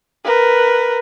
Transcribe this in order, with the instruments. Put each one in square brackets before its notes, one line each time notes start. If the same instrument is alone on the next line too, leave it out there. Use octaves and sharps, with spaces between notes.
[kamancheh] A#4 B4